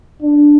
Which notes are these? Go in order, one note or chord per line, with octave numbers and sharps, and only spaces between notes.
D4